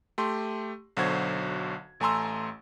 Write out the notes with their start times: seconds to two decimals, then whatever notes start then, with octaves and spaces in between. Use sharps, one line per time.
0.18 A3 G4 C6
0.97 B1 D3 F#3 F#4 C5 G#6
2.00 A1 A3 G#5 A#5 C6 E6